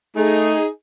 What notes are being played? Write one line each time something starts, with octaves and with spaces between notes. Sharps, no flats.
A3 D#4 G#4